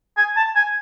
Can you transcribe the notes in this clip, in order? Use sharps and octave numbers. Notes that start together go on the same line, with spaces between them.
G#5
A5
G#5